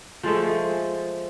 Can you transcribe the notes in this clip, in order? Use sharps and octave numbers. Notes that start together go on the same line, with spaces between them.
F3 G#3 A3